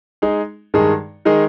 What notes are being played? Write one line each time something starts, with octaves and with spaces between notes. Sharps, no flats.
G#3 D#4 G#4
G2 D#3 G#3 D#4 G#4
D#3 G#3 D#4 G#4